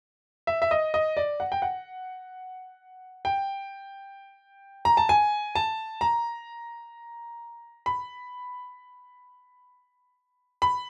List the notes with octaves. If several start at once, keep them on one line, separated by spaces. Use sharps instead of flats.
E5
E5
D#5
D#5
D5
F#5
G5
F#5
G5
A#5
A5
G#5
A5
A#5
B5
B5